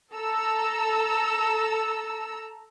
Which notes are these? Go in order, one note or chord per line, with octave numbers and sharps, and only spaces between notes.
A4 A#5 E6